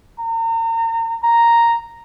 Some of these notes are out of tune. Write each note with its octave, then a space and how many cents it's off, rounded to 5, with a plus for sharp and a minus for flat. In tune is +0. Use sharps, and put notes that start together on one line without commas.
A#5 -35
A#5 +0